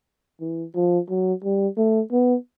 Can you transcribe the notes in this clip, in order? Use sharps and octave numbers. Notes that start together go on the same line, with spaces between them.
E3
F3
F#3
G3
A3
B3